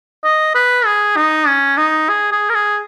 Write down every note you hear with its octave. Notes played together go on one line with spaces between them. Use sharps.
D#5
B4
G#4
D#4
C#4
D#4
G#4
G#4
A#4
G#4